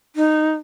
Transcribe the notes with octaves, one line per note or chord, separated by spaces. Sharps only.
D#4